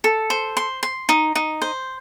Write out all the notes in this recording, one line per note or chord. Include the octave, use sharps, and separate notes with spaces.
A4
C5
C6
C6
D#4
D#4
C5